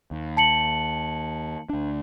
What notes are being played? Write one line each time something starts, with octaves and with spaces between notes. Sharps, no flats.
D#2
A5 C#7 F#7
D2 D4